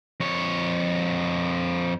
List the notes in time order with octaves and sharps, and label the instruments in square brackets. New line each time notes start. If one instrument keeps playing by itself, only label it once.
[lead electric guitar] F2 C#5